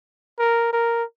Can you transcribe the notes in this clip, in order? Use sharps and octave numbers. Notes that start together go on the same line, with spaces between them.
A#4
A#4